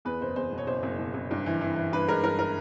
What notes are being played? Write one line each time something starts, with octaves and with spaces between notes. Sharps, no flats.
E2 B4
F#1 C5
E2 C5
B2
C#5
F#1 C5
F#1
B2
F#1
G2
E3
E3
E3
G2 B4
G#3 A#4
G2 A#4
A#4